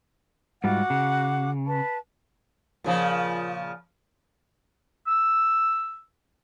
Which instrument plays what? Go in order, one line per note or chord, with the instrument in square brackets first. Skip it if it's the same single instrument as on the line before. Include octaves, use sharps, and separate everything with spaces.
[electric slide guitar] G#2 G3 F4 [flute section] F#4 F#5 D6
[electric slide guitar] C#3
[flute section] B4 A5
[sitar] A#2 C#3 F3
[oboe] E6